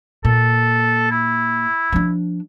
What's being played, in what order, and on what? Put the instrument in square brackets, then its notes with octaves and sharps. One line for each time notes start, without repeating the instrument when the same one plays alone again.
[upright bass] A#2 [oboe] A4
[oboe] E4
[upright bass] F3 D4